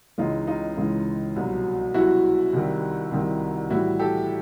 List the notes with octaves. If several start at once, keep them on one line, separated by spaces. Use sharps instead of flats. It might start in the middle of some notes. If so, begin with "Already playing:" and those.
C#2 C#3 E3 G#3 D#4 F4
D#4 F4
C#2 C#3 E3 G#3
C2 B2 F#3
C2 B2 F#3 E4 F#4
C2 C3 D#3 G3
C2 C3 D#3 G3
A2 E3 G3 E4 F#4
G4 A4